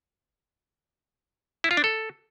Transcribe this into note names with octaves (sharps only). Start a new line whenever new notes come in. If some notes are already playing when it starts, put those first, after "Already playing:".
E4
F4
D4
A4